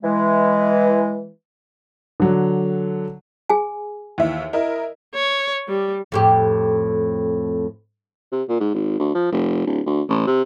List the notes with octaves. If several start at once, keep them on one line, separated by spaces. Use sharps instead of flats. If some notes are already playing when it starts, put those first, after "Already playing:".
E3 G#3
D3 F#3
G#4 G#5
D#2 E3 E5
E4 A#4 D#5
C#5
G3
F2 A2 G4
C3
A#2
G#2
G#1
D2
F3
F1
D1
D2
A1
C3